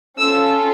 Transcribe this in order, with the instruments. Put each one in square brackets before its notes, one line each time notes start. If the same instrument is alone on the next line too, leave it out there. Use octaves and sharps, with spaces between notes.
[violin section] C#4 F4 A4 E6